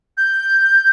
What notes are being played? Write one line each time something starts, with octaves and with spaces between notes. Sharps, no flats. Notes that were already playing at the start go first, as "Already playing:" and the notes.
G6